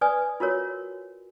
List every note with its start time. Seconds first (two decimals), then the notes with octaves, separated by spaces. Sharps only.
0.01 B4 D5 G#5 D#6
0.40 F4 F#4 A#4 C#5